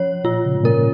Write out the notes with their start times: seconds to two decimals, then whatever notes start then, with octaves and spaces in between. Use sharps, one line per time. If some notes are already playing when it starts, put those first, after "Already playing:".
Already playing: F3 C#4 C#5
0.24 A#2 F4
0.44 C#3
0.55 G#2
0.64 A#2 A#4